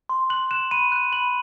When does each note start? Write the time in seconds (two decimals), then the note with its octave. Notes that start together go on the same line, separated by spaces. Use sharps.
0.09 C6
0.30 F#6 F#7
0.51 F#6 E7
0.71 B5 D#7
0.92 F#6
1.12 B5 F#7